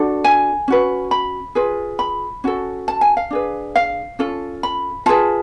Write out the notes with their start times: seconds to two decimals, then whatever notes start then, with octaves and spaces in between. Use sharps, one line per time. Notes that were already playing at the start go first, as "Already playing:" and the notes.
Already playing: D4 F#4 A4
0.24 G#5
0.68 C#4 F#4 B4
1.11 B5
1.55 F4 G#4 B4
1.99 B5
2.44 C#4 F#4 A4
2.88 A5
3.01 G#5
3.17 F5
3.31 D4 G#4 B4
3.76 F5
4.19 C#4 F4 A4
4.63 B5
5.06 F4 G#4 B4 A5